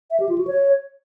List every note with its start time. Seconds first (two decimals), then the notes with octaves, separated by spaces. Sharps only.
0.11 E5
0.20 G4
0.29 F4
0.38 F#4
0.47 C#5